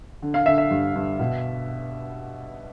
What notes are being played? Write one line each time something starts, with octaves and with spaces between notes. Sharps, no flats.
D3
F5
D3 E5
E5
G2
G2
B2